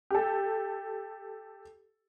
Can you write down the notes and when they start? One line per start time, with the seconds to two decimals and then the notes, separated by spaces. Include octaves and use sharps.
0.11 G4 A4